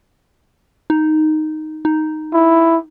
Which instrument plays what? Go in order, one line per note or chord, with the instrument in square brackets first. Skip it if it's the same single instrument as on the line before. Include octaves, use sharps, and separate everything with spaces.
[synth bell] D#4
D#4
[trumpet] E4